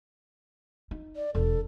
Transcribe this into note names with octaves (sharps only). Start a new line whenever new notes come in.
D#4
D5
E1 A4